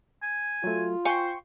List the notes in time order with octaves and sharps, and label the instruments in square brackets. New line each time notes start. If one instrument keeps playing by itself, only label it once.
[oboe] G#5
[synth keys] F#3 A3 [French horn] F4
[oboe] C5 [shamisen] F5 G#5 [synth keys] G5 C6 C#6